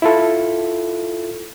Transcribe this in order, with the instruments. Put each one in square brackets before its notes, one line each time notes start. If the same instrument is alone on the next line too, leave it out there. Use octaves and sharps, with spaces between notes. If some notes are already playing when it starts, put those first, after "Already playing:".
[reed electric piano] E4 F4 A4